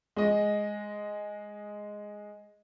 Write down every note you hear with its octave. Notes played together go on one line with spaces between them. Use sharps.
G#3 D#5